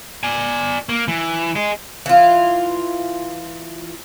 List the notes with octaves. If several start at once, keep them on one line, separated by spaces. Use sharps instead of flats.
D5 G#5
A#3
E3
G#4 D#5
E3 F4